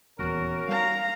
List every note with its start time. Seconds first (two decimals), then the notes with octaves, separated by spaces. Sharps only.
0.19 D#1 E2 C#4 F#4 A#4
0.68 G3 F5 A#5